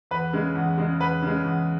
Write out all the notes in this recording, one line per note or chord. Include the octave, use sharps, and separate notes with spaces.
E2 B4
C#3 G#3
E2
C#3 G#3
E2 B4
C#3 G#3
E2